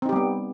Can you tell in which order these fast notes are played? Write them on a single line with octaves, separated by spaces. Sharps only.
C4 D#4 G4 G3 B3